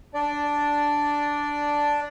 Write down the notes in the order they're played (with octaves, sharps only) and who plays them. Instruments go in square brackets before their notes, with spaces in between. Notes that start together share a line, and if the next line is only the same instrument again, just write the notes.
[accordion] D4 D5